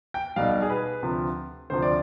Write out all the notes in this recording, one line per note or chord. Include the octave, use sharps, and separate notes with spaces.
G5
B1 B2 G3 F5
G#4
B4
D2 C3 F3
D2 C3 F3 C5
D5